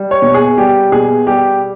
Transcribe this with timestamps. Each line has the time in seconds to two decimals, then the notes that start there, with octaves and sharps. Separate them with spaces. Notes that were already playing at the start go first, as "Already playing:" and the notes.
Already playing: G3
0.11 C#5
0.22 B2
0.34 G#4
0.57 G3 G4
0.92 B2 G#4
1.27 G3 G4